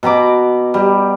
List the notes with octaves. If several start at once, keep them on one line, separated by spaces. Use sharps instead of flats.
B2 A#5 B5 D6
G3